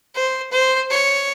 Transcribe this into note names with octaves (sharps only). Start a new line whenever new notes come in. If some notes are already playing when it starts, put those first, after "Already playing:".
C5
C5
C#5